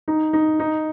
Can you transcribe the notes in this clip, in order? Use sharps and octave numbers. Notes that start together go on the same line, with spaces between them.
D#4
D#4
D#4